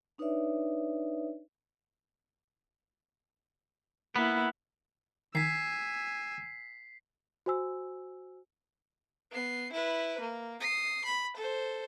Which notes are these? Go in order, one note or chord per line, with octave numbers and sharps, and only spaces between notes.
D4 D#4 B4 C#5 D5 E5
A#3 B3 E4
D#3 G#5 E6 B6 C7
F#4 C5 G#5 E6
B3 C7
E4 B4
A#3
D#6 C7
B5
A4 C5